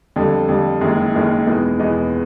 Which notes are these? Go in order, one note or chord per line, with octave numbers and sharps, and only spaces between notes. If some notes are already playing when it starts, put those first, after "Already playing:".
F2 D3 G3
F2 D3 G3
F#1 F#2 D#3 G#3
F#1 F#2 D#3 G#3
E2 B2 G#3 B3 D#4
E2 B2 G#3 B3 D#4